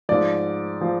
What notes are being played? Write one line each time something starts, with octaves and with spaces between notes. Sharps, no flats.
G#2 F3 D5
F3